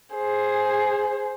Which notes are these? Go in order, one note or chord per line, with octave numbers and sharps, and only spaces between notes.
G#4 C5